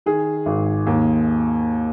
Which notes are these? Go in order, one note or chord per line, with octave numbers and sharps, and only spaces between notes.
D#3 G#4
G#1
D#2